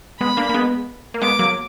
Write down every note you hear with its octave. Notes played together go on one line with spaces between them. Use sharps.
G#3 B3 B5
A#3 D4
A#3
G#3 B3
A#3
G#3 B3 D6
F#3 A#3